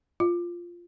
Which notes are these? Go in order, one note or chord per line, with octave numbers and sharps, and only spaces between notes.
F4